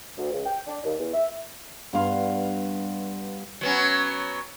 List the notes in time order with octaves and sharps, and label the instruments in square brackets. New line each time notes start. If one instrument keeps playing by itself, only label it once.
[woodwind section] D2
C#2
G5
D4
D#2
E2
E5
[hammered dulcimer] G2 B3 F5 C6
[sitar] F#3 B3 C#4